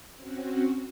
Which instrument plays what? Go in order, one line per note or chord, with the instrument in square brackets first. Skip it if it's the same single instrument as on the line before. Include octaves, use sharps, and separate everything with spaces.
[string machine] C4 C#4 F#4